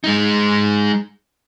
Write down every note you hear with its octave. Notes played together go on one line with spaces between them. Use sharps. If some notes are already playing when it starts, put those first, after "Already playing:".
G#3 D#4